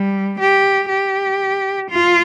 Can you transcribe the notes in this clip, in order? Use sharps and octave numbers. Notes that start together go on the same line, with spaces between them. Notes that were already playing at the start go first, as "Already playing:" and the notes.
Already playing: G3
G4
G4
F4